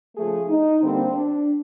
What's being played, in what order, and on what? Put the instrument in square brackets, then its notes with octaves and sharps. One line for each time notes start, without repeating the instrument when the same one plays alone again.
[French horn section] C#3 F3 A3 G#4
D#4
D3 G3 A#3 C4
D4